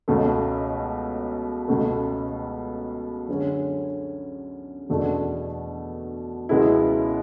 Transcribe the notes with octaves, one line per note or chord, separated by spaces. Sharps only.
C#2 B2 A3
C#2 B2 A3
F#2 D3 G#3 C#4
E2 B2 A3 D4
C#2 B2 G#3 B3 E4